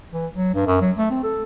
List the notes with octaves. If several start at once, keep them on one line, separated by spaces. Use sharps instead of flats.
E3
F#3
G2
F#2
F#3
A3
C4
A4